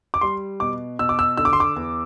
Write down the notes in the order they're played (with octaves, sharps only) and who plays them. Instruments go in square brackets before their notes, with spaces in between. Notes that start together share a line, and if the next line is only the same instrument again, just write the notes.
[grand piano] D6
G3 C6
B2 D6
B2 E6
D6
E6
D3 E6
D6
C6
D6
E2